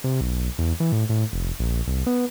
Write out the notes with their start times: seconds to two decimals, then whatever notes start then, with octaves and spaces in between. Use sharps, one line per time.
0.04 C3
0.21 B1
0.59 E2
0.80 E3
0.92 A2
1.09 A2
1.33 F1
1.59 A#1
1.87 C2
2.06 B3